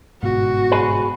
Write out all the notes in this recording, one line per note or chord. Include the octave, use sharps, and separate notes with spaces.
G1 G#2 B2 F#4
G#4 B4